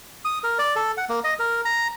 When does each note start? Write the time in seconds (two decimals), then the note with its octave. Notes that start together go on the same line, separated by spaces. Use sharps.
0.25 D#6
0.44 A#4
0.59 D5
0.76 A4
0.97 F#5
1.09 A#3
1.24 D#5
1.39 A#4
1.65 A#5